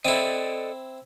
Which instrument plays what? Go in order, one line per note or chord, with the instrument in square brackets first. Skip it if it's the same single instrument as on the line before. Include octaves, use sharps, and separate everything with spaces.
[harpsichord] C4 E4 [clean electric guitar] A4 D5 D#5